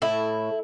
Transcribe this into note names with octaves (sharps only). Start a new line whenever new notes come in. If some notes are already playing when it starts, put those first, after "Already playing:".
A2 E4